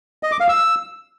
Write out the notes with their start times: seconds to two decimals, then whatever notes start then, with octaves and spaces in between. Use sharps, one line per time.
0.23 D#5
0.32 D6
0.40 F5
0.49 E6